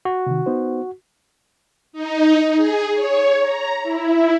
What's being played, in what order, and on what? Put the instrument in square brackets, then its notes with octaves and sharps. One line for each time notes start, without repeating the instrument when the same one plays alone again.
[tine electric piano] F#4
[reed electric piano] C3 D#3
B3 D#4 C5
[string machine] D#4
G#4
C#5
A#5
E4